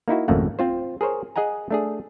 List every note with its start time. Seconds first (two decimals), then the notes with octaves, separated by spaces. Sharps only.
0.08 A#3 D#4 E4 F#4
0.28 G#1 F2 C#3 A3 A#3 F#5
0.59 C4 F4 C5
1.01 G#4 A#4 C5 C#5
1.36 G#4 D#5 F#5 G#5 A#5
1.71 A3 D4 G#4